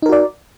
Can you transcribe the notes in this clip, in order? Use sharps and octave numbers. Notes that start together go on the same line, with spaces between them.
D#4 F#4 A#4 D5